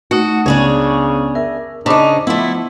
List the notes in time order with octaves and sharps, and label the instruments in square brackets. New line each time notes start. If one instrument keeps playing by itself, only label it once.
[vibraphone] A3 D#4 F#5 [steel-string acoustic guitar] F#4
[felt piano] C#2 [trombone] C#3 [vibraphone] B3 [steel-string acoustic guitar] D4 G#4 C#5
[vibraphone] A#4 [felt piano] E5
[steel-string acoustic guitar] C#3 D#4 [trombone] D4 [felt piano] C5 B5 D6 [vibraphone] A5
[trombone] F3 [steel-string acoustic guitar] A3 E4 [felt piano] B3